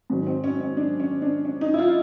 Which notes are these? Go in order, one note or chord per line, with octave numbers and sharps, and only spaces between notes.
G#2 D#3 F#3
C4
C#4
C#4
D4
C#4
D4
C#4
D#4
E4
F4